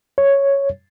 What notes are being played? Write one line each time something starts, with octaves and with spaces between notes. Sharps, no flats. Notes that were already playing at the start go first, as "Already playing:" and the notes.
C#5